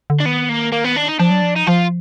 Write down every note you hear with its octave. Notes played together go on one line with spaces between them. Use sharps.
D3
D4
D#3 B3
A#3
A#3
B3
D4
D#4
F3 D4
F#3
F3
D#4
F3 F4